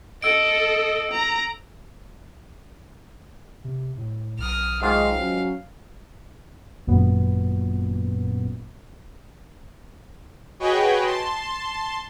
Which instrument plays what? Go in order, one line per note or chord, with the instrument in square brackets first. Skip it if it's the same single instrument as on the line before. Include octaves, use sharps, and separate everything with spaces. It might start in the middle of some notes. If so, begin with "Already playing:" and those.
[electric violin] A4 D#5 [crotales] E6 D7
[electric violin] A#5
[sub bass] C3
A2
[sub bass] B1 [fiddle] D#6 F6
[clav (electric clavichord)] G#2 D#3 F4 [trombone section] G#3 D#4 [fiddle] F5
[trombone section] F#3 C#4
[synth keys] G#1 F#2 A#2 B3
[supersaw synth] F#4 G#4 B4 C#5 D#5 G5
A5 C6